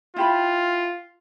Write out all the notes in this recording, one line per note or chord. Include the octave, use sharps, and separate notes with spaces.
E4 F4 G4 B5